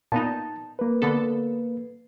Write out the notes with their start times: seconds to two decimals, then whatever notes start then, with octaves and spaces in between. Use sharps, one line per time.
0.12 A#2 B3 D#4 A5
0.79 A#3 B4
1.02 D3 B3 A4